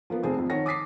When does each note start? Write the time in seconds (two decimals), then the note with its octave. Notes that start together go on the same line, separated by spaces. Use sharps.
0.10 F3 A#3 B3
0.23 F1 C4 G#4 A5
0.36 F2 C3 F3
0.50 D#3 C#5 F#5 A5 A#6
0.66 D6 D#6 A6 B6 C7